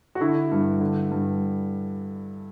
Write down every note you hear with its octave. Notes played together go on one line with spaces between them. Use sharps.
F#4
D3 E4
G2
D3
G2